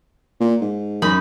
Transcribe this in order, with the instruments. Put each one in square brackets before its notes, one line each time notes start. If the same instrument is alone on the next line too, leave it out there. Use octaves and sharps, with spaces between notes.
[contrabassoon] A#2
G#2
[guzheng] F#2 D#4 B5